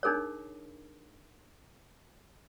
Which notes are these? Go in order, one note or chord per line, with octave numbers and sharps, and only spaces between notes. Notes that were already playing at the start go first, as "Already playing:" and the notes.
D4 D#4 G#4 A#4 C#5